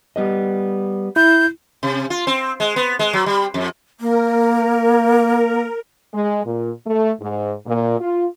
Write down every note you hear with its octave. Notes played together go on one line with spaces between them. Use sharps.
G3 B3 D#5
E4 G6
C3
F4
C4
G#3
B3
G#3
F#3
G3
F2
A#3 A#4
G#3
A#2
A3
G#2
A#2
F4